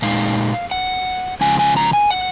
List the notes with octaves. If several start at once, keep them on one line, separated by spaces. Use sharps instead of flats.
A#2 G#3 D#4 F5
F#5
C#3 F3 G#3 G#5
G#5
A#5
G#5
F#5